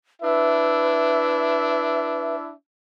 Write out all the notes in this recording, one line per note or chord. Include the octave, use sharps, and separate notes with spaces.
D4 E4 B4 E5